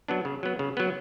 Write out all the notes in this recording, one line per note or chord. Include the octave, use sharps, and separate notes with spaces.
F#3 B3 D4
C#3
F#3 B3
C#3
F#3 B3